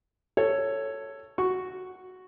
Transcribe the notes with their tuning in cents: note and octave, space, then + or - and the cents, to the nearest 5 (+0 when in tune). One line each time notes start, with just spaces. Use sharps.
A4 +15 C#5 +0
F#4 +0 C#6 +0